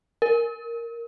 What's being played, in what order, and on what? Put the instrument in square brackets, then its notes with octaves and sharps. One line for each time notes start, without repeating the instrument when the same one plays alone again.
[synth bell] A#4